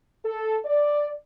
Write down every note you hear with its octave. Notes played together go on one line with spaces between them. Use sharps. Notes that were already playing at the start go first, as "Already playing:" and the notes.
A4
D5